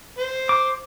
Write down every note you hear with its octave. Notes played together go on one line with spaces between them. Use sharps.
C5
D6